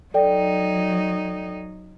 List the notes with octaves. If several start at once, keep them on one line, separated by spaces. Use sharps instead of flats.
F#3 D#4 A4 D5 G5